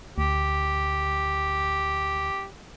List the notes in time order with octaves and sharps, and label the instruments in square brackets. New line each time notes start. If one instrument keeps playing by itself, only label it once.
[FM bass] D2 [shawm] G4